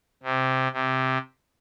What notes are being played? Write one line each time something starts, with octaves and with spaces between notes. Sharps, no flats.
C3
C3